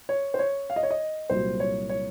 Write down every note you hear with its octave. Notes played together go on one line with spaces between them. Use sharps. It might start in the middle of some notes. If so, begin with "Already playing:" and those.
C#5
C5
C#5
F5
D#5
C#5
D#5
C2 A#2 F#3 C5
C#5
C#5